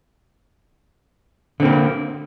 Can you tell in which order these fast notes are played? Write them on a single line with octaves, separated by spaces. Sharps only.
D3 C4 A#3